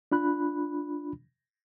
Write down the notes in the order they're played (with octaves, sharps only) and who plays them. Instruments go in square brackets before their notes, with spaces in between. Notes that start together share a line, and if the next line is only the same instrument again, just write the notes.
[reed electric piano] D4 F4 B5 F#6